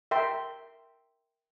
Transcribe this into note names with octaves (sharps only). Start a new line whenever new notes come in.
A#4 E5 G5 C6